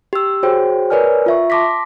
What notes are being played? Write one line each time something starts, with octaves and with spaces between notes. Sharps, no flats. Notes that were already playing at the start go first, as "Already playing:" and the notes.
G4 E6
F#4 G#4 C5 C#5 G5
A#4 B4 C#5 D5 G#5 F6
F4 E5 C#6
A5 C6 D6 A#6 B6